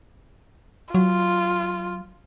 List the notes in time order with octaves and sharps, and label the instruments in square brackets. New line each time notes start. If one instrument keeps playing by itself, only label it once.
[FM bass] F#3 [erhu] F4